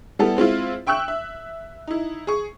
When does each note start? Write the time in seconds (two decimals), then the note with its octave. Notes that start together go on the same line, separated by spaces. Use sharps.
0.19 G3 B3 E4 A4
0.37 G#3 C4 E4 F4
0.87 E5 G5 C#6 E6 F#6
1.08 E5
1.87 D#4 E4
2.27 G#4 C#6